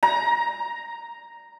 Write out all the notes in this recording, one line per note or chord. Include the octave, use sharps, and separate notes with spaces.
A#5